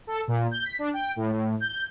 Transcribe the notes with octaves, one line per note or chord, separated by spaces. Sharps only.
A4
A#2
G6
B6
D4
G5
A2
A2
G6